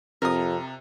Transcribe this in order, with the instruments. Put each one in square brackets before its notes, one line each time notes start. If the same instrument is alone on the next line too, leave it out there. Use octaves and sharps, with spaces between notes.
[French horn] F2 [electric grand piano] C3 [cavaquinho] A#4 D#6